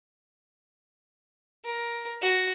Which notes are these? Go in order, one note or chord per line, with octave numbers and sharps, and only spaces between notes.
A#4
F#4